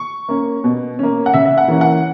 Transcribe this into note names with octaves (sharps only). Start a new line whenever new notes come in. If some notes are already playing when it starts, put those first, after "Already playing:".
Already playing: C#6
A#3 C#4
B2
A#3 C#4
F#5
C#3 E5
E5
F#5
E3 A#3 C#4
F#5